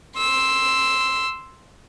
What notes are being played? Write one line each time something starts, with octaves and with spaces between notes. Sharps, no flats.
C6 E6